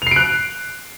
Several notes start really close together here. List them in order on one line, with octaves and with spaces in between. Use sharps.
F7 C7 D7 F#6